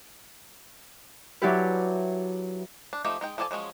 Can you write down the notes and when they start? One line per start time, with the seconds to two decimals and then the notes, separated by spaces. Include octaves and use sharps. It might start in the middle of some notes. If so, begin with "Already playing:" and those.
1.42 F#3 D4 E4 G4 B4
2.93 D4
3.05 F3 A3 D#4 G4
3.21 G#3 D#4 G5
3.38 F3 A4 D5 G#5 A5
3.51 F3 F#3 G#3 C#4